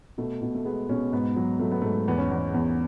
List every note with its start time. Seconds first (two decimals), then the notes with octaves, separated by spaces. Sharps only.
0.18 B2 A3
0.42 B2
0.55 A3
0.65 G#3 B3
0.89 B2 C#4
1.13 G#2 B3
1.36 F#3
1.59 F#3 A3
1.71 B3
1.82 G#2 A3
2.08 E2 B3
2.18 C#4
2.30 E2 B3
2.54 E2